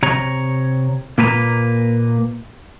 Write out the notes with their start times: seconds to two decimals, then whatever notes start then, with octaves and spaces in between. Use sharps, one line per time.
0.03 C3 C#5 A#5
1.18 A#2 A#3 B4 A5 A#5